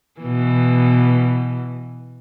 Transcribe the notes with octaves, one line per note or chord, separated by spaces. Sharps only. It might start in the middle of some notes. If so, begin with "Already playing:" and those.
B2 E3